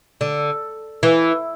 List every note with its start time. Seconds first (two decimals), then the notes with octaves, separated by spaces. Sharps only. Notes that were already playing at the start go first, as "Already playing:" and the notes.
0.21 D3
1.03 E3